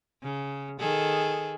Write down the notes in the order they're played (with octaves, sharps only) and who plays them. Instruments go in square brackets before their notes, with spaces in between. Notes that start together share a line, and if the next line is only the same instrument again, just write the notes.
[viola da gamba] C#3
D#3 G#4 A4